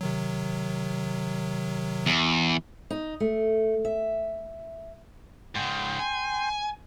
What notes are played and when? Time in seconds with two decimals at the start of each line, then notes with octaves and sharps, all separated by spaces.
0.01 C3 D#3 F#3
2.06 E2
2.90 D#4
3.20 A3
3.85 E5
5.56 G#2 C#3 G5 C6
5.99 G#5